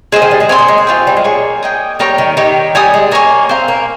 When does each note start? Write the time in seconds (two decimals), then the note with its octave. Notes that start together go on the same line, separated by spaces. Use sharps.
0.12 G#3 G#4 C5 D#5
0.22 D#3
0.31 G3
0.40 G#3
0.49 C4 C#5 G#5 C6 D#6
0.59 A#3
0.68 G#3
0.78 C4
0.87 F4 G#4 C#5 G5
1.07 G3
1.17 G#3
1.24 A#3 G#4 C#5 G#5 C#6
1.63 G#4 D#5 G5
1.99 G3 A#4 C#5 G5 A#5
2.18 D#3
2.37 D#3 D#4 G4 C#5
2.75 G3 C#5 G#5 D#6
2.94 G#3
3.11 A#3 A#4 C#5 G#5 C#6
3.49 C4 C5 F5 A#5
3.68 A#3